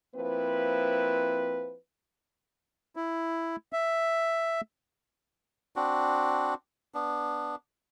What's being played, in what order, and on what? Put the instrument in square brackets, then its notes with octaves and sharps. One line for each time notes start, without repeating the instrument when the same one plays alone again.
[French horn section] F3 A#3 C4 E4 B4
[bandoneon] E4
E5
[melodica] C4 D4 F#4
B3 D4